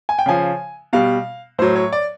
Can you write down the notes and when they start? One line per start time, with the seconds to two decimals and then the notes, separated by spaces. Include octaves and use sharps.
0.09 G#5
0.19 G5
0.26 C#3 F3 G#5
0.93 B2 G3 F5
1.59 A2 F#3 C5
1.76 C#5
1.92 D5